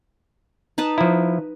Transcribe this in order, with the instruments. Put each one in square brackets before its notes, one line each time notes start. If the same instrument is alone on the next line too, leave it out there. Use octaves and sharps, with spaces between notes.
[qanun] D#4 B4 A5
[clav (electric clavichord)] F3 E4